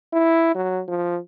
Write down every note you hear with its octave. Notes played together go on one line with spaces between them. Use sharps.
E4
F#3
F3